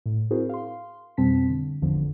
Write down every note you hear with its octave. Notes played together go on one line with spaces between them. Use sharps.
A2
C4 E4 F#4 G#4 A#4 C5
F5 C6
F2 B2 G3 C4 A5 B6
D3
G#1 E2 D3 F3